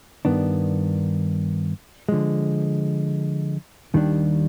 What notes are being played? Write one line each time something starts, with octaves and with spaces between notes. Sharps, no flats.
G2 D#3 B3 D4
D3 F3 G#3
D#2 D#3 G3 D4